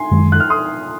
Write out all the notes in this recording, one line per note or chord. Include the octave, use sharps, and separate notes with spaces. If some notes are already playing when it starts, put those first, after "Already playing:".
Already playing: G#5 C6
F#2 D#3 G#3
F#6
F6
C6 D#6